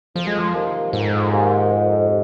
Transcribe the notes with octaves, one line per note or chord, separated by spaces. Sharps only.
F2 F3
G#3
F3
C3 D#3 A#3 F4
F2 G#2
C3 D#3 A#3 F4
F2
C3